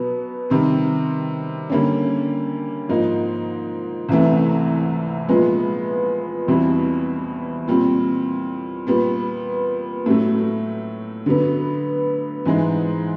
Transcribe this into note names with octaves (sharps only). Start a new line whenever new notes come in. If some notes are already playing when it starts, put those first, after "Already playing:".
Already playing: B2 F#3 B3
C3 D#3 G3 C4
D3 G3 A#3 C#4
G#2 F3 A#3 D#4
C2 C3 E3 A3
A#2 F3 G#3 B3
E2 B2 G3 C4 E4
A#2 G3 C4
A#2 G3 B3
A2 F#3 A3
D3 F#3 B3
G#2 E3 G#3